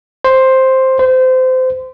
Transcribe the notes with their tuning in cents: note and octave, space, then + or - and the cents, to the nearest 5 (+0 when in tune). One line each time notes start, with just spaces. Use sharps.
C5 +5
C5 -25